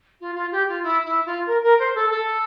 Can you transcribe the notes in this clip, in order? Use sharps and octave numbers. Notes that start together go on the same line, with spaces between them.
F4
F4
G4
F4
E4
E4
F4
A#4
A#4
C5
A4
A4